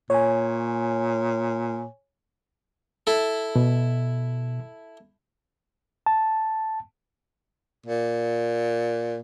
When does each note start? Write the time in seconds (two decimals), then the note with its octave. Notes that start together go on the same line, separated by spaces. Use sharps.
0.10 A#2 C#5 G#5
3.07 E4 A4
3.56 B2
6.06 A5
7.86 A#2